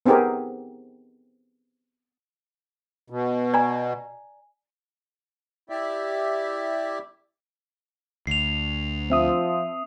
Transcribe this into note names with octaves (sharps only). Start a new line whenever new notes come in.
B3 C4 D#4 G4 G#4 A#4
B2
D5 G#5 A#5
E4 G4 D5 E5
D2 C7 F7
F3 C4 E5 D#6